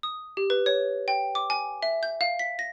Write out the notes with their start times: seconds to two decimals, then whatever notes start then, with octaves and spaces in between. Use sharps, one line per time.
0.03 D#6
0.37 G4
0.50 B4
0.66 C#5
1.08 G5
1.35 D6
1.50 G#5
1.83 E5
2.03 G6
2.21 F5
2.39 B6
2.59 A#6